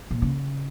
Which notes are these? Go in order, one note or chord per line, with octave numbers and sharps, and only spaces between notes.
A#2
C#3